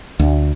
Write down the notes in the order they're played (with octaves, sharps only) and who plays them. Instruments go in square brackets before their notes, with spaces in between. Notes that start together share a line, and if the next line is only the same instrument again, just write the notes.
[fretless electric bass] D2